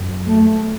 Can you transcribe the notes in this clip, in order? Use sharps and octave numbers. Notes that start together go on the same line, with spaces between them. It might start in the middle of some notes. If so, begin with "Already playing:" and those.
Already playing: F#2
A3